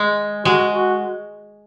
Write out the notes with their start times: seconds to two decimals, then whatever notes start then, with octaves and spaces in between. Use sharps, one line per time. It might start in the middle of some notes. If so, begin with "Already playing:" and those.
Already playing: G#3
0.45 G#3 F#4
0.74 F#4